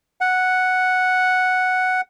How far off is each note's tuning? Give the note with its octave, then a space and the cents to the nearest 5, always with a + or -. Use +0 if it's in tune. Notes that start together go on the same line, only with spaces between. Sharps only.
F#5 +0